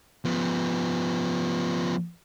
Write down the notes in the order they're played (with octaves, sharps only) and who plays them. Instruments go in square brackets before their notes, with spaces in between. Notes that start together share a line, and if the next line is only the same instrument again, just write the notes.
[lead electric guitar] F3 B3